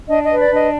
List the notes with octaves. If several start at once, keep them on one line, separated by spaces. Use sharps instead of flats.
D4 D#5
D#5
B4
D5
D4 D#5